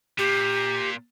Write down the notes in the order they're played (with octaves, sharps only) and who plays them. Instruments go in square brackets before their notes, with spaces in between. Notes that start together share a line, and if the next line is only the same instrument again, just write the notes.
[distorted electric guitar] A#2 [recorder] G4